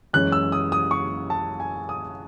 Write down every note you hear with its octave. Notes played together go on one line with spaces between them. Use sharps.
F#2 E3 G#3 C#4 F#6
E6
D#6
D#6
C#6
A5
G#5
D#6